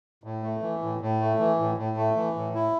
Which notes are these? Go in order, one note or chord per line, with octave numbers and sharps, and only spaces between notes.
A2
A3
E3
A2
A2
A3
E3
A2
A2
A3
E3
A2
E4